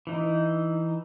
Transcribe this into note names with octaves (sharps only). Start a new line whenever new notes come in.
E3 D#4